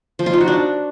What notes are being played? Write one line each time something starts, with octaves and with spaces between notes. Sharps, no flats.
F3
F4
D#4
F#4
D4